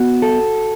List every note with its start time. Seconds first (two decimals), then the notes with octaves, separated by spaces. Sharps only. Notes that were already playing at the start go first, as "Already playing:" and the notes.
Already playing: B3 F#4
0.22 A4